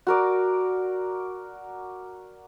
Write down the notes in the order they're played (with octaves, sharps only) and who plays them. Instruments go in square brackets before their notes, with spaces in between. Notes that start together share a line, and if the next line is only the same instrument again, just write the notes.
[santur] F#4 A#4 D5